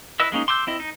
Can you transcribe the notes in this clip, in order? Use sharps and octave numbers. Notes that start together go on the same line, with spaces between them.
E4 B4 D#5 E6
G#3 A#3 C#4 D#4
C6 D6 E6 G6
C4 E4 D#5
D#4